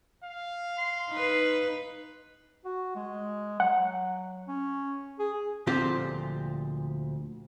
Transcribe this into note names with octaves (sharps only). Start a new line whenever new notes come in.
F5
C6
D#4 B4
F#4
G#3
F#3 F#5
C#4
G#4
D2 A#2 F3 C4 F4 G4